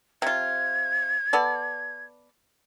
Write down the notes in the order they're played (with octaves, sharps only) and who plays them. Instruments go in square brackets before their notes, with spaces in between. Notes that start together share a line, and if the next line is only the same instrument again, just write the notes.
[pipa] C3 F4 [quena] G#6
[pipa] B3 A4 D5